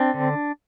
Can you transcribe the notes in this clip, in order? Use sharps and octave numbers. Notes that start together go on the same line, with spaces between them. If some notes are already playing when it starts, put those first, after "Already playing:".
Already playing: C4 D4
D3